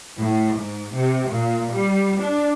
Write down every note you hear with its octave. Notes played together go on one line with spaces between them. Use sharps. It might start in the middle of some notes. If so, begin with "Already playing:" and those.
A2
G#2
C3
A#2
G3
D4